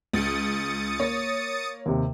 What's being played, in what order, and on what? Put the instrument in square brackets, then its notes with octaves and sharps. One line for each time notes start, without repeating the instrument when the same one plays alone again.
[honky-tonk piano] C#2 [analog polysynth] D#6 A6 C#7
[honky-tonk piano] A#3 C#5
[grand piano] D#2 C3